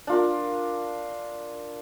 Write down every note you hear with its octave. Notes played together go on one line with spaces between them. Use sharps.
D4 F4 A#4